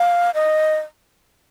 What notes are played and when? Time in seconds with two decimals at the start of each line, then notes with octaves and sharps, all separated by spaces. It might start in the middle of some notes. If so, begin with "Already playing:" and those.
Already playing: F5
0.34 D#5